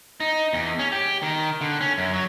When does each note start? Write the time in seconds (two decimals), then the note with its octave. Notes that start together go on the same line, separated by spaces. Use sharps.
0.20 D#4
0.53 E2
0.79 C#4
0.92 G4
1.23 D#3
1.61 D3
1.81 C#4
1.98 F#2
2.13 F#3